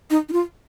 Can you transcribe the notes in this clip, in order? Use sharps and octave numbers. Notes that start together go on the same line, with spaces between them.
D#4
D#4
F4